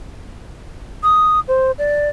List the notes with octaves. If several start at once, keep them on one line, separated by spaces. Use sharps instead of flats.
D#6
C5
D5